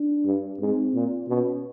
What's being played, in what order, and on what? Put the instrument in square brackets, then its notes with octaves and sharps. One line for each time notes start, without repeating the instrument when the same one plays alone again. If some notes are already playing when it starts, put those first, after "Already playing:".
Already playing: [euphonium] D4
[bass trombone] G2
[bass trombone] G#2 [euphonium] C4
[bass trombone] A#2
[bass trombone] B2 [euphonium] C#4